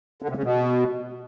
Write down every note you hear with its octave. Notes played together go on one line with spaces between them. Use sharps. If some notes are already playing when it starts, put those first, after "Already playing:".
D3
C3
C#3
B2